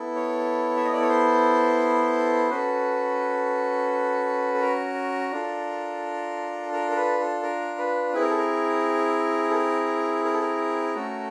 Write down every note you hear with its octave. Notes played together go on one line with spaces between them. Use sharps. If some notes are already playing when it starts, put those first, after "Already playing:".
Already playing: B3 E4 A4
C#5
E5
D#5
D5
C#5
C5
C#4 F#4 A4 B4
A4
A#4
D4 F4 A4
A#4
A#4
B4
A4
A#4
B4
C4 E4 G#4 B4
A#4
A4
A#4
A4
A#4
A#4
A4
A#4
A3 C#4 F#4 A4